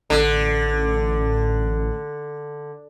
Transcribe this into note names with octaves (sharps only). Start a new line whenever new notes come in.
A1 D3